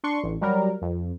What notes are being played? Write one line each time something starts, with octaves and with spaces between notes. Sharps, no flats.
D4 C6 C#6
A1
F#3 G3 A#4
F2